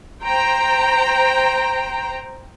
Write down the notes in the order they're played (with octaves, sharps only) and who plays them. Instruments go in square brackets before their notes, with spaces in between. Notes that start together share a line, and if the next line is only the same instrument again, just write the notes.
[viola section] C5 G5 A#5